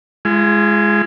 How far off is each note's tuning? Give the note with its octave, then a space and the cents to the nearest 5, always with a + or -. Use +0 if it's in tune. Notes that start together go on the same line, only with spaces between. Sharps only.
G#3 +0 F4 -45